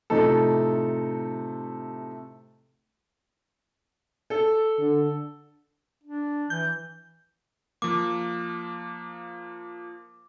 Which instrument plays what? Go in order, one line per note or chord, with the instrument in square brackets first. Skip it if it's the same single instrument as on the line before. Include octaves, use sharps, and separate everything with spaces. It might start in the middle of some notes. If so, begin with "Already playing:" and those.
[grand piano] A2 C3 F3 A3 D#4 A4
[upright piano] A4
[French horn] D3
[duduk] D4
[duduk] E3 [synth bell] G6
[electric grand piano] F3 A#3 [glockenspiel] D6